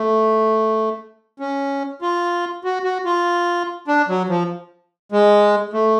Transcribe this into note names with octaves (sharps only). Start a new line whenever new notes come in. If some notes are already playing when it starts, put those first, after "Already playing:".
Already playing: A3
C#4
F4
F#4
F#4
F4
D4
F#3
F3
G#3
A3